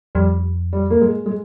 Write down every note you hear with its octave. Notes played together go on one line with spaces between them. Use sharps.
F2 G3
G3
A#3
G#3
G#3